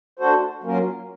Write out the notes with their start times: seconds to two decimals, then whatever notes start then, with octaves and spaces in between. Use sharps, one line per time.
0.19 A3 D4 F#4 A4 C5
0.63 F#3 A#3 C#4 F4 A#4